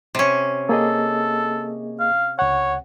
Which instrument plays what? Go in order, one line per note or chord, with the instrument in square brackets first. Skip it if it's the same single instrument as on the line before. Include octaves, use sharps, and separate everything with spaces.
[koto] C3 C#4
[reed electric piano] A#3 G#4 D#5 [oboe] A4
[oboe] F5
[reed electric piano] C#2 F#5 [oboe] C#5